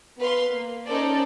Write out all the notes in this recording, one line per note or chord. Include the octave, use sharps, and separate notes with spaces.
B3 B4 F5 C6
A#3
C#4 D#4 A4 A#4 C5 D5